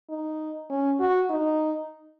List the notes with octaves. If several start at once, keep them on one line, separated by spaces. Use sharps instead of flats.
D#4
C#4
F#4
D#4